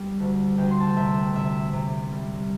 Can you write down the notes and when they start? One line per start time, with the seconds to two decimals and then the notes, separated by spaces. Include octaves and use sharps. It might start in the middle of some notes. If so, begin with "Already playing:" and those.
Already playing: G3
0.20 D2
0.58 D2 G5
0.71 C6
0.80 A5
0.89 G5
0.97 C3 E5
1.35 C3 E5
1.73 C3
2.12 G3